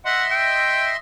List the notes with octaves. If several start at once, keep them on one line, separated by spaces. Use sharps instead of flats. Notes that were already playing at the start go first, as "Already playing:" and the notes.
D#5 E5 F#5 C6
G5